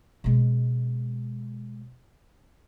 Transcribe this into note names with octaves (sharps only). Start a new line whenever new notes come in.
B2 G#3